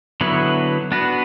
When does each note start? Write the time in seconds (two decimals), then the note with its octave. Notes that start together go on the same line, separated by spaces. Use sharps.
0.21 D3 F#3 B3 E4
0.92 B3 D4 F#4 B4